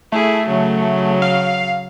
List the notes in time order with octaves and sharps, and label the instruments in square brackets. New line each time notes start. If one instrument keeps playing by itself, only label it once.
[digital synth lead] A3 [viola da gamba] E4 G#4
[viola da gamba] C#3 F#3
[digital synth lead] F5